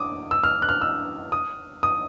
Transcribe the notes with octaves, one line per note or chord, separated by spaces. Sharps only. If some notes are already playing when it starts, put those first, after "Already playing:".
Already playing: D6 D#6
E6
F6
F#6
F6
E6
D#6
D#6